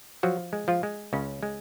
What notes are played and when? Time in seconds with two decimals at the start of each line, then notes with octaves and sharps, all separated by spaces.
0.23 F3 F#3 F#4
0.53 G#3
0.68 F3 F4
0.83 G#3
1.13 C#2 C#3 C#4
1.43 G#3